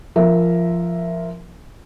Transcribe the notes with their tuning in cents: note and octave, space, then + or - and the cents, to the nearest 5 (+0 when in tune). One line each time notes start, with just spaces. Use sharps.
F3 -15 A#4 +0 E5 +0